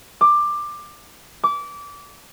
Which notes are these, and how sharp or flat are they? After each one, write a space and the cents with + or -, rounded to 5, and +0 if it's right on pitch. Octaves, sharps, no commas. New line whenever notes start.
D6 +15
D6 -25